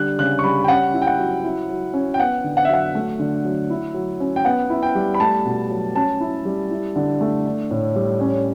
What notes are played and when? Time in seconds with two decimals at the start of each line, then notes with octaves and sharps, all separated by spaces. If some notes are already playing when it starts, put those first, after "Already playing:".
Already playing: D3 G3 D4 F#6
0.19 C#3 F#6
0.39 C#6
0.44 G3 B5
0.64 G5
0.68 C#4 F#5
0.94 E4
1.02 G5
1.07 F#5
1.19 F#3
1.44 E4
1.69 F#3
1.94 C#4
2.14 G5
2.19 B3 F#5
2.44 D3
2.57 F#5
2.65 E5
2.70 F#3 F#5
2.95 A3
3.19 D3
3.44 F#3
3.70 E4
3.94 F#3
4.20 C#4
4.36 G5
4.45 B3 F#5
4.70 E4
4.83 G5
4.95 G3
5.15 B5
5.20 A3 A5
5.45 B2
5.70 F#3
5.96 C#4 A5
6.20 E4
6.45 G3
6.71 E4
6.96 D3
7.21 A3
7.46 D4
7.71 A2
7.96 G3
8.21 C#4